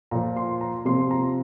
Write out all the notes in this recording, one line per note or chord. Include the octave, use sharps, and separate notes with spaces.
A#2 F3 A#5
C6
A#5
C3 F3 C6
A#5